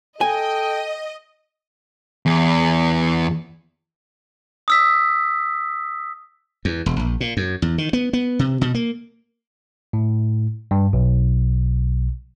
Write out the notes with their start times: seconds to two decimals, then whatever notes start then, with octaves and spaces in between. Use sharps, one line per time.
0.21 A4 D#5 G5 G#5
2.26 E2
4.68 D#6 E6 B6
6.65 E2
6.86 E1
6.99 A#1
7.20 A#2
7.37 F#2
7.62 E2
7.78 D#3
7.93 B3
8.13 B3
8.39 C3
8.61 B2
8.74 A#3
9.93 A2
10.71 G2
10.93 B1